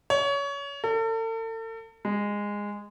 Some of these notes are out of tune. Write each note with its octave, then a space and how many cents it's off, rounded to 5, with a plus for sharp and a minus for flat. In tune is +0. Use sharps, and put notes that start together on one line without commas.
C#5 +25
A4 +40
G#3 -15